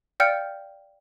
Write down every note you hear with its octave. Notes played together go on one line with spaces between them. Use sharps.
D5 F5 G5 F6 G6 C#7